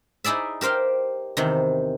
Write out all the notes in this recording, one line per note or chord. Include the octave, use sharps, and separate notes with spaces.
D#4 E4 G#4 D5 E5
G4 A#4 C5 F5 G5
E2 C3 D#3